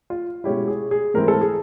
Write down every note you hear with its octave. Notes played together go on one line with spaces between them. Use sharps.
F4
B2 G#3 C#4 E4 G4
G#4
G#4
G#2 E3 A3 C4 E4 A#4
A4
G#4